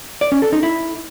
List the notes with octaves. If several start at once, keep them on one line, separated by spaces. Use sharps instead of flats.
D5
C#4
A4
D#4
E4